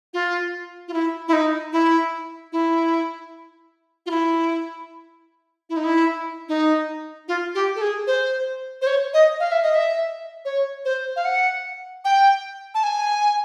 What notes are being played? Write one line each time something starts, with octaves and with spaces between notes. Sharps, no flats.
F4
F4
E4
E4
D#4
E4
E4
F4
E4
E4
D#4
E4
D#4
F4
G4
A4
G#4
C5
C5
C#5
D#5
F5
E5
D#5
E5
C#5
C5
F5
F#5
G5
A5
G#5